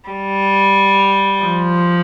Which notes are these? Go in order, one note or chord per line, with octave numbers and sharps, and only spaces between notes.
G3
F3